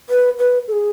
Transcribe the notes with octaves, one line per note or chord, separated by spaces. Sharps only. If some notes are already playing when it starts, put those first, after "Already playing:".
B4
B4
A4
G#4